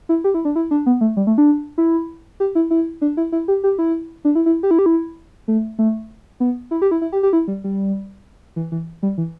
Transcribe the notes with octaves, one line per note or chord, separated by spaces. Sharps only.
E4
G4
E4
D4
E4
D4
B3
A3
G3
A3
D4
E4
G4
E4
E4
D4
E4
E4
G4
G4
E4
D4
E4
E4
G4
E4
G4
E4
A3
A3
B3
E4
G4
E4
E4
G4
G4
E4
G3
G3
E3
E3
G3
E3